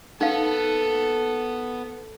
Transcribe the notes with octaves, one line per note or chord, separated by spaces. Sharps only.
B3 D#4 A4 F5